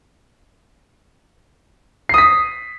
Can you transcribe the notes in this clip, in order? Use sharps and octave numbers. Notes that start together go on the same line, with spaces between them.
D#6 B6 C7